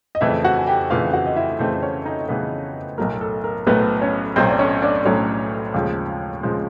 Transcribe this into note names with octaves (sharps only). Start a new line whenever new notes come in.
D#5
F2 C#3 E3 A3 E4 E5
F#4 F#5
G#5
G4 G5
F2 C#3 E3 A3 F4 F5
F#4 F#5
D#5
E4 E5
F2 C#3 E3 A3 C4 C5
C5
C#4 C#5
D#4 D#5
F2 C#3 E3 A3 B3 B4
B1 A2 F#3 A3 A#4
A4
A#4
B1 A2 F#3 A3 B3 B4
C#4 C#5
B1 A2 F#3 A3 C4 C5
D5
C#4 C#5
D4 D5
B1 A2 F#3 A3 C#4 C#5
D#2 C#3 F3 G#3
C#3 F3 G#3 C4 C5